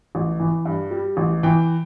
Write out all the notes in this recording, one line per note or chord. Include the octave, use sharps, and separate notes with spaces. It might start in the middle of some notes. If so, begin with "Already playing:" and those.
A1
E3
G2
G3
A1
E3 G5